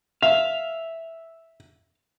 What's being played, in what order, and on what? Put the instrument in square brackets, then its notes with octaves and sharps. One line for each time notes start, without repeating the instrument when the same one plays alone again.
[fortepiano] E5 [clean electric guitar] F5